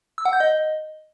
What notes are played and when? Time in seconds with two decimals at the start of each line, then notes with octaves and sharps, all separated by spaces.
0.18 E6
0.25 F#5
0.33 G6
0.40 D#5